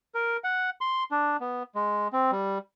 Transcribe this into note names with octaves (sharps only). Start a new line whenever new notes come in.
A#4
F#5
C6
D4
B3
G#3
C4
G3